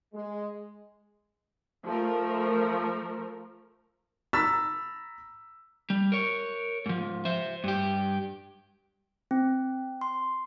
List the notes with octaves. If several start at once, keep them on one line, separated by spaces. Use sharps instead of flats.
G#3
F3 A3 A#4
A#5 B5 E6 A6 B6
G3
A#4 C#5
G#2 F3
C5 E5
G2 G4
C4
C6